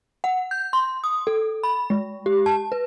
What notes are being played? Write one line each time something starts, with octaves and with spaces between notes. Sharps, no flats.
F#5
G6
C6
D#6
A4
B5
G#3
G4
A5
B4